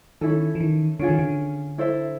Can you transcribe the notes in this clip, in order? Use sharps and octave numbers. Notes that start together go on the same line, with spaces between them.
D#3 C#4 E4 A4
E3
D#3
D3 C#4 F4 G#4
D#3
D3
E4 A4 C5 E5